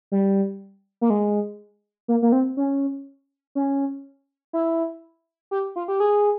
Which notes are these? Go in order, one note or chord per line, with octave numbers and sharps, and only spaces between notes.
G3
A#3
G#3
A#3
A#3
C4
C#4
C#4
E4
G4
F4
G4
G#4